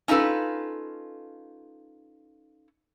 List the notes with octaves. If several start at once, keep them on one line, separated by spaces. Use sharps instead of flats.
C#4 D#4 F4 A4 B4